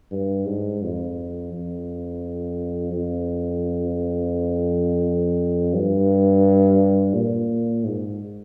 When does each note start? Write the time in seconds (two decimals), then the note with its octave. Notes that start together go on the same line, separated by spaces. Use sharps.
0.12 G2
0.47 G#2
0.83 F2
1.53 F2
2.92 F2
5.74 G2
7.14 A#2
7.84 G#2